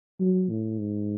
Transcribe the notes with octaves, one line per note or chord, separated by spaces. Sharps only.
F#3
A2
G#2